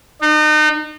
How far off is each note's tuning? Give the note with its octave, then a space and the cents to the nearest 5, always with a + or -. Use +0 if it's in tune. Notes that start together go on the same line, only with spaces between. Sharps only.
D#4 -35